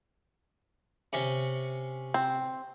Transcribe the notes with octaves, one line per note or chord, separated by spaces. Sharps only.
C3 C#4
C4